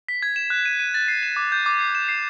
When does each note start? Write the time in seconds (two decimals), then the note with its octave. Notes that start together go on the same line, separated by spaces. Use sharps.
0.09 B6
0.23 G#6
0.36 E7
0.50 F#6
0.65 D#7
0.80 D#7
0.94 A6
1.08 C7
1.23 E7
1.36 D6
1.52 G6
1.66 D6
1.81 C7
1.95 E7
2.08 C7